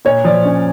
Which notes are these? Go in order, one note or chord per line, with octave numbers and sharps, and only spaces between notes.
A#2 C#5
F3 D5
C#4